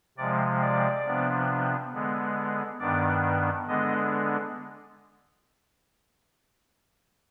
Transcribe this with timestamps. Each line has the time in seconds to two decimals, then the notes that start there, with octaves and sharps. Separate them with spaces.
0.18 C3 F3 G#3 D5
0.61 D5
1.05 C3 F3 B3 D4
1.93 D3 G#3 B3
2.80 G2 D#3 B3 D4 D5
3.67 D3 G#3 B3 D4 D#5